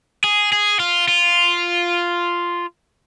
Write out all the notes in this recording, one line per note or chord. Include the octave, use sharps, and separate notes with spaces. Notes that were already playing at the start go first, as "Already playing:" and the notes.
G#4
G#4
F4
F4